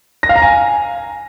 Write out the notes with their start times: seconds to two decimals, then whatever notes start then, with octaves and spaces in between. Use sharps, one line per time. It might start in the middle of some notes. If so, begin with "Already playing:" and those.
0.23 A#6
0.29 F5
0.36 A#5
0.42 G#5